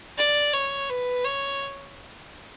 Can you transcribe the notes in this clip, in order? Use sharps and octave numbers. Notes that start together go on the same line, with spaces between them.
D5
C#5
B4
C#5